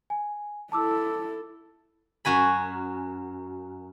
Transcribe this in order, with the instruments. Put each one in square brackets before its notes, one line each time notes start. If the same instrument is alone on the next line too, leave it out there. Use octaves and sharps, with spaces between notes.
[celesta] G#5
[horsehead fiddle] E4 A4 [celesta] A5 D6 E6
[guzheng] F#2 F#4 G#5 B5